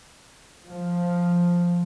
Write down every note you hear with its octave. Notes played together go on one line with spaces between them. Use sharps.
F3